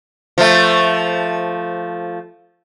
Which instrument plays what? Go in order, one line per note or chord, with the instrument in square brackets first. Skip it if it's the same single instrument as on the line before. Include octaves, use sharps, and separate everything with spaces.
[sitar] F3 A3